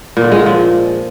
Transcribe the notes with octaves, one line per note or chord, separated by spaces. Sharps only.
A#2
D3
G#3
A#2
F3